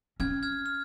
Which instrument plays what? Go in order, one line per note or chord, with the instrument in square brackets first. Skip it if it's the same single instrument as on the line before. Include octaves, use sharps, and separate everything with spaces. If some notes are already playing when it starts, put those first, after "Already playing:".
[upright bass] C#4 [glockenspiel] F6 G#6
[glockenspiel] F6 G#6
F6